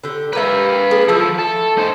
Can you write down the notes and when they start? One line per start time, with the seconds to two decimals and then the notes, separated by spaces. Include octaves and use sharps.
0.03 D3 G4
0.33 G4 A#4 B4 E5 F5
0.91 A#3 G#4
1.08 F3 A3 E4
1.38 A4
1.78 D#4 C5